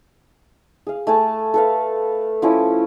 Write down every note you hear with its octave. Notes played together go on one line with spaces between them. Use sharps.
G#4 F5
A3 G#5 A5
A4 B4 F5
F3 C#4 E4